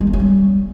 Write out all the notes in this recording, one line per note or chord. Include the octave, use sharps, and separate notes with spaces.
G#3
A#3
C#4
G3